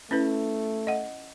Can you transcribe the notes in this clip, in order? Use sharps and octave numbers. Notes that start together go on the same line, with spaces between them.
A3 C#4 E4 B4
D#5 F#5